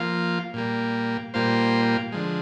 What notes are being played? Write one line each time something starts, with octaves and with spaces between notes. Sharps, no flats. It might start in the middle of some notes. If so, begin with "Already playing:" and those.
Already playing: F3 A#3 F4
A#2 G3 A#3
A#2 G3 A#3 F4 C5
D3 F3 G#3